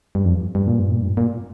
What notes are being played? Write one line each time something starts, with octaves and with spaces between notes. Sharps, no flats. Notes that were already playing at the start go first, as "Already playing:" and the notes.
G2
F2
G2
A#2
G2
A#2
G2
A#2